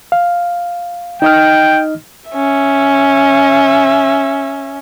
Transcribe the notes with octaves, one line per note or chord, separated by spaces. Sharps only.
F5
D#4 D#5 G5 F6
C#4 E5